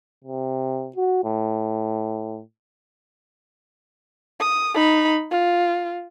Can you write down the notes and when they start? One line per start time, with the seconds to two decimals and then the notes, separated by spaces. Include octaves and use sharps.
0.24 C3
0.96 F#4
1.24 A2
4.40 D#6
4.74 D#4 B5
5.31 F4